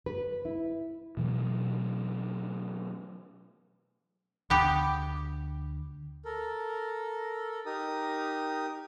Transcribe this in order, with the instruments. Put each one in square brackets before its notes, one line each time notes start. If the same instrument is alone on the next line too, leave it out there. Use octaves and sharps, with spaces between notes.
[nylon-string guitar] B4
E4
[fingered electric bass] B2 E3 F#3 A3
[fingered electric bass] D2 [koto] B3 G4
[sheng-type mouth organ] A4 A#4
D#4 G4 A#4 D#6